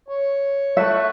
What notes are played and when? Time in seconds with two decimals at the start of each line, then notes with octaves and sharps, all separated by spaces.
0.08 C#5
0.77 A3 E5 F#5 C#6